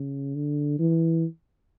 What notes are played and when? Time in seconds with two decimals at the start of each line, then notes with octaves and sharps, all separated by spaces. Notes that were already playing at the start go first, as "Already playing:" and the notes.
Already playing: C#3
0.35 D3
0.79 E3